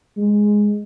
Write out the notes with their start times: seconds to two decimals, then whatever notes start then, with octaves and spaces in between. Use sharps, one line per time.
0.17 G#3